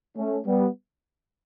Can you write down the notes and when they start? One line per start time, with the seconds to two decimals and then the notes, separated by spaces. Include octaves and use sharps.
0.16 A3 C#4
0.45 G3 B3